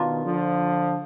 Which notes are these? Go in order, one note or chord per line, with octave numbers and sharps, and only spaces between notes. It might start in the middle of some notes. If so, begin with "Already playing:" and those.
Already playing: B2 D#3 A#3 D4 F4
D3 F3